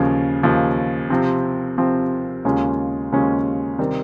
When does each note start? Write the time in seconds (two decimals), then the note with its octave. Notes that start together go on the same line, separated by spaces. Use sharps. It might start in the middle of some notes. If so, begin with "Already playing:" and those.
Already playing: D#2 C#3 F3
0.43 D#2 C#3 F3
1.10 C3 F3 C4
1.78 C3 F3 C4
2.45 D#2 C#3 G#3 C#4 F4
3.12 D#2 C#3 G#3 C#4 F4
3.79 C3 D#3 G3 C4